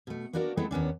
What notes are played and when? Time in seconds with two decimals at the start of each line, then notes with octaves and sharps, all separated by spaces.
0.07 B2 A3
0.33 A#3 B3 D4 F#4 G4 A#4
0.57 G#3 A3 B3 C4 E4 A4
0.71 D#2 B3 C#4 D4